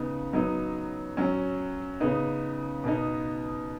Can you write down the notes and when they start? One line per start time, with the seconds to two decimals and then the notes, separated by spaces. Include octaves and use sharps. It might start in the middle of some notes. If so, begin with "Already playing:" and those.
Already playing: C#3 B3 D#4
0.33 F#3 B3 D#4
1.17 F#3 C#4
2.00 C#3 B3 D#4
2.84 B2 B3 D#4